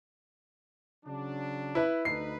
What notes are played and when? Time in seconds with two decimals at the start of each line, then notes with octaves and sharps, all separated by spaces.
1.05 C#3 F#3 D4
1.75 E4 B4
2.05 D2 D#4 B4 C7